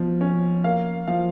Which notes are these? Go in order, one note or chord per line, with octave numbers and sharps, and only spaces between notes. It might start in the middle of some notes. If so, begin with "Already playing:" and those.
Already playing: B2 F3
C#4
A#3 F5
F3 F5